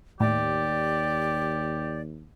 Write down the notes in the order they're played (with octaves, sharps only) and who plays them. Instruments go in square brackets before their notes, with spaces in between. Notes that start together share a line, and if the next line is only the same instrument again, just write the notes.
[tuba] D#2 [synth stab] A2 [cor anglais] G4 [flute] D5